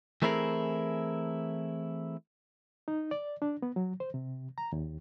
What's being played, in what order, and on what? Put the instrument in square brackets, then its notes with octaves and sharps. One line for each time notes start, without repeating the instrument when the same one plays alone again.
[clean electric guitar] E3 A3 C4 E4 G#4 A#4
[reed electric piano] D#4
D5
D4
B3
F#3
C5
C3
A#5
D#2